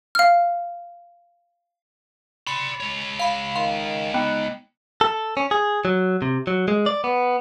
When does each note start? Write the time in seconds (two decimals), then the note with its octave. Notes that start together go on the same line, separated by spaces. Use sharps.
0.15 F5 F6
2.47 D5 B5 C6
2.80 G#3 C#5
3.19 F5 B5
3.56 D#3 F5 C6
4.14 B3 D#4 G5
5.01 A4
5.37 C#4
5.51 G#4
5.85 F#3
6.22 C3
6.47 F#3
6.68 G#3
6.86 D5
7.04 B3